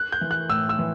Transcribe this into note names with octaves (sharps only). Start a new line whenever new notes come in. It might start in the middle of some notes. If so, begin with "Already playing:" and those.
Already playing: F#6
G6
E3
F#6
A2 E6
E6
E3